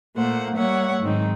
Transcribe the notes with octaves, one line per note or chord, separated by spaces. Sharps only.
A#2 A3 A#3 C5 F#5
G3 A#3 C#5 E5 F#5
G#2 D#3 F#3 C4 D#4